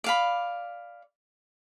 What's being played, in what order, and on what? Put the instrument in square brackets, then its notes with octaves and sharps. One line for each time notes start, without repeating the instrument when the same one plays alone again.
[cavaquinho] D5 F5 B5